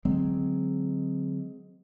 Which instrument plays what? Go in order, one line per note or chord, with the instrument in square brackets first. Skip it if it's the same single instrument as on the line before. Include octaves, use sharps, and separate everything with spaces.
[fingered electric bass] D3 F#3 G#3 C4